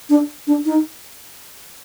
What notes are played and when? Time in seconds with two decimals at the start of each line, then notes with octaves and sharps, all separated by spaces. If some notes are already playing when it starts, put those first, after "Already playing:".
0.09 D4
0.47 D4
0.66 D#4